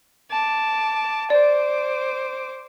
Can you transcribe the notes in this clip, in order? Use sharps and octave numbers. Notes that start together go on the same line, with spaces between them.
A5 D6
C5 D5 D6